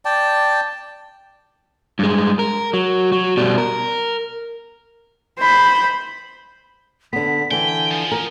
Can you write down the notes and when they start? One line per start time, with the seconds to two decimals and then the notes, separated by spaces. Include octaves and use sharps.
0.05 D5 G5 A5
1.99 G2 G#3
2.39 A#4
2.73 F#3
3.12 F#3
3.37 B2 G3
3.58 A#4
5.39 C5 B5
7.13 D3 B3 B6
7.51 D3 E3 G5 G#5
7.91 F3
8.12 A#4